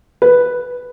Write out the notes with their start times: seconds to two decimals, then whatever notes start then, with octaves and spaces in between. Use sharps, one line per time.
0.22 B4